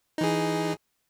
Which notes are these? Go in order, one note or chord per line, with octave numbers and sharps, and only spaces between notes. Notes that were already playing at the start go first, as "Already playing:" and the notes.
E3 D#4 G#4